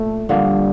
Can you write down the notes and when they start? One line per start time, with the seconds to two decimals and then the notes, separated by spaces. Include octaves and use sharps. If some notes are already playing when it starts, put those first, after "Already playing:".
Already playing: A#2 A3
0.29 D3 F3 G3 A#3